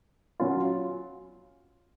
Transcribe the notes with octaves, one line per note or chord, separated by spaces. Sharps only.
F#3 C#4 F4